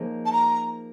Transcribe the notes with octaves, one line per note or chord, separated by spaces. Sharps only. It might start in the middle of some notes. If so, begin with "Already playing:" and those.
Already playing: F3 A#3 D#4 G#4 C#5
A5
A#5